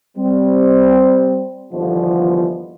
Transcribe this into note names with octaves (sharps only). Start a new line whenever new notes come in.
G3 C4
G1 D#2 B2 D3 E3 F3